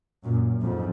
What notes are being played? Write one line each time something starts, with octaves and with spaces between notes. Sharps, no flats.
F#2 A#2
F2 G#2